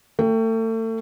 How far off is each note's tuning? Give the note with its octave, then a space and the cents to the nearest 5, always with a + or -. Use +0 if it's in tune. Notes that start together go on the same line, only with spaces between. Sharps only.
A3 +35 G5 +0